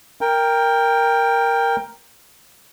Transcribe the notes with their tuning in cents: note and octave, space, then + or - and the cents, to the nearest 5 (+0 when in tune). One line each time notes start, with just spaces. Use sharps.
A#4 +0 G5 +15